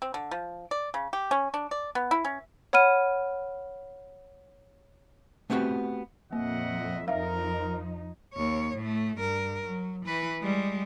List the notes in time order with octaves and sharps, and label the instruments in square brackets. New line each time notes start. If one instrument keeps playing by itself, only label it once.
[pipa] C4
D3
F3
D5
C#3
G4
C#4
D4
D5
B3
E4
C#4
[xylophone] C#5 F#5 B5 F6 D#7
[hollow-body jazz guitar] A3 B3 C4 D#4 F#4 G4
[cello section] F2 A#2 [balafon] A#3 [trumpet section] D#5 E5 F#5
[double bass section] F2 [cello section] F3 D#4 [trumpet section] A#4 [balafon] E5 F5
[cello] D#2 C#5
A2 A3
G2 A#4
F#3
E3 B4
G3 G#3